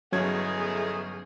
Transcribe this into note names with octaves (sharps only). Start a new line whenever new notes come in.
G1 E2 D#3 F#3 A3 C#4 G#4 G#6